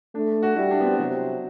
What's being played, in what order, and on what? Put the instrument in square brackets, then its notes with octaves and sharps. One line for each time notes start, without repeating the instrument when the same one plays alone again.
[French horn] A3 [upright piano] D4
[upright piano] F#4
[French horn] G3 [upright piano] E4
[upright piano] D4
B3
C4
[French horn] C3 [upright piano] F#3